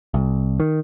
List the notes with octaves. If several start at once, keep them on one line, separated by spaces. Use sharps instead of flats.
C2
D#3